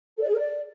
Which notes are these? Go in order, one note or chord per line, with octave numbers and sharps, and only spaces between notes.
A4
D5
G#4
A#4
D5